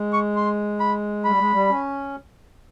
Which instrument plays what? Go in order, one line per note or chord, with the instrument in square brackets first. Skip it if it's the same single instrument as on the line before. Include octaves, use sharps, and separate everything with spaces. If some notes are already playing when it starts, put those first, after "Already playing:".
Already playing: [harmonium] G#3
[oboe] C#6
C6
B5
[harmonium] G3 [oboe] B5
[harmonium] G#3
G3
C#4